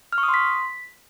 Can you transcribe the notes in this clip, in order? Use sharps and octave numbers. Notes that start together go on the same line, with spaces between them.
F6
C#6
D#6
C6
B6